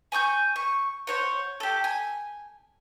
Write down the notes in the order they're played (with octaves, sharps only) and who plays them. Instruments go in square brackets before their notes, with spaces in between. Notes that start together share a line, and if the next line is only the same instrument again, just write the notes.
[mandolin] G#5 C#6 E6 G6
C#6
C5 C#5 F#5
G4 A4
G#5